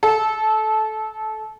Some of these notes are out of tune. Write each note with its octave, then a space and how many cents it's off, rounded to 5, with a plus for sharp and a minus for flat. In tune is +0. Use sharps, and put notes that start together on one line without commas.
A4 -20